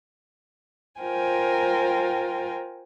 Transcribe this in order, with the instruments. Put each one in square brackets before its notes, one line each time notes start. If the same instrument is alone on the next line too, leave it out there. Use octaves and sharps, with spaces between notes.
[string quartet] F4 A#4 C5 G5 G#5